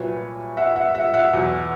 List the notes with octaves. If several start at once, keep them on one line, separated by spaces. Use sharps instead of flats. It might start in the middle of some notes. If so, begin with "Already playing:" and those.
Already playing: C2 A#2 F#3 B4 C#5
E5 F#5
E5 F#5
E5 F#5
E5 F#5
E2 B2 F#3